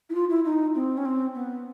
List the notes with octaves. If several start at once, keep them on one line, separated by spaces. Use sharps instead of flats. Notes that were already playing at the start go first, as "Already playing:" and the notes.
E4
F4
E4
D#4
C4
C#4
C4
B3